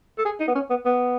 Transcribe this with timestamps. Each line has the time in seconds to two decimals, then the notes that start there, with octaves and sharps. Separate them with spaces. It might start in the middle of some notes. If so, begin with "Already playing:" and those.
0.18 A4
0.25 G#4
0.40 D#4
0.48 B3
0.55 C#4
0.70 B3
0.85 B3